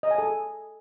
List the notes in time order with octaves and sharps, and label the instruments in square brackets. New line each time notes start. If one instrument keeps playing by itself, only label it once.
[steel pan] D#5
G#5
A4